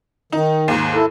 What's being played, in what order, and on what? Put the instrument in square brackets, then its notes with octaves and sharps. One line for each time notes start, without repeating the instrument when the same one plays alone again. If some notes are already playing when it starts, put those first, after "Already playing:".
[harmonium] D#3 [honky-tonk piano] D#4
[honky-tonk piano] D#2 G#2
[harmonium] E4 A4